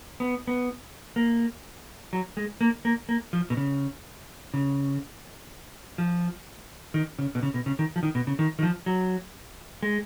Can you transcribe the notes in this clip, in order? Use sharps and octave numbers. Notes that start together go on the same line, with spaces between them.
B3
B3
A#3
F#3
G#3
A#3
A#3
A#3
F3
B2
C#3
C#3
F3
D#3
C#3
B2
C#3
B2
C#3
D#3
F3
D#3
B2
C#3
D#3
D#3
F3
F#3
G#3